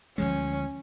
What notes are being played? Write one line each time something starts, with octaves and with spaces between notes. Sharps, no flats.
D2 F3 G#3 C#4